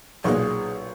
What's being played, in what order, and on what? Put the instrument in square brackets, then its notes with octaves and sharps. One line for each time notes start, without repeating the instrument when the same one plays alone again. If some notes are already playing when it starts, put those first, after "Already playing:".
[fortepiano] B1 A#2 [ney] G#4